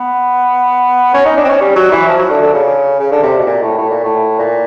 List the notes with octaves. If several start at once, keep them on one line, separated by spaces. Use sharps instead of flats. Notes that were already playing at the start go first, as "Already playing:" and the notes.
Already playing: B3
C#4
D#4
D4
C4
C#4
G3
F#3
E3
F3
F#3
D3
D3
C#3
C#3
D3
C3
B2
A#2
A2
A2
A#2
A2
A#2